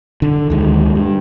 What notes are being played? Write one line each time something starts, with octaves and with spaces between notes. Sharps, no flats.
D3
D2 D#3 G#3
G2